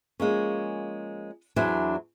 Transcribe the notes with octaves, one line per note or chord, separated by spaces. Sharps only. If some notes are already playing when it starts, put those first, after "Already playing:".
F3 G#3 A#3 C#4
E2 F#3 D4 E4 C5 G#5